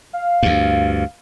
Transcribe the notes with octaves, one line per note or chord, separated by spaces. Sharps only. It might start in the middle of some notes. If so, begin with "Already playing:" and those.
F5
D2 G2